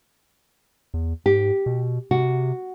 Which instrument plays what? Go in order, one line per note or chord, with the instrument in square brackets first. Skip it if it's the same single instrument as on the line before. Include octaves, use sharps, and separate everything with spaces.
[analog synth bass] E2
[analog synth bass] G#2 [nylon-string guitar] G4
[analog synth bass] B2
[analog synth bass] C3 [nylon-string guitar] F#4